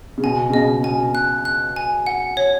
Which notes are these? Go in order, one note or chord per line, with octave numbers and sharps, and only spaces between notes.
C#3
B2 G#5
C#3
B2 D#5
B2 G#5
F#6
F#6
G#5
F#5
C#5